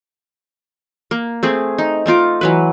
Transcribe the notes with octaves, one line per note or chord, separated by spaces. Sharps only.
A#3
A3 C4 G#4
D#4
A3 D#4 F4 D6
E3 F#3 B4